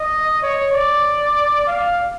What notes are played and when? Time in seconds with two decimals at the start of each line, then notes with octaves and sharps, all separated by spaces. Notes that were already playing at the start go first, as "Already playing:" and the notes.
Already playing: D#5
0.43 C#5
0.73 D5
1.67 F5